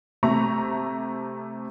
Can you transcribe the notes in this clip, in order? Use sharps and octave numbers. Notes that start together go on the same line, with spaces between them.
C3 A3 A#5 C#6